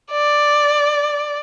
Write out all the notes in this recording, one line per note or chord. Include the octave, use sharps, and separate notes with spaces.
D5